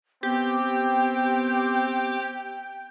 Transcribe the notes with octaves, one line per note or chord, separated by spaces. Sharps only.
B3 C4 G4 G5